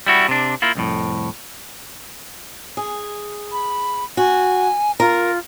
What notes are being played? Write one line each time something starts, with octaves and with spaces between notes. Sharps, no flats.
G3 E4 F#4
C3 D4
A#3 E4 F4
C2 F2 A2
G#4
B5
F#4 G#5
F4 A#4 A#5